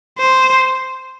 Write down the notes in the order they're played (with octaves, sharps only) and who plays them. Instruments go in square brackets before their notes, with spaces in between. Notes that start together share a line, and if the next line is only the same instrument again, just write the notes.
[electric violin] C5